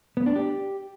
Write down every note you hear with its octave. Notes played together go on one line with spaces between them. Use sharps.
B3
D4
G4